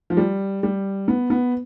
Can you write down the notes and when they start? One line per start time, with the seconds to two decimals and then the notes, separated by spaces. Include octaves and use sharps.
0.10 F3
0.17 G3
0.63 G3
1.08 B3
1.30 B3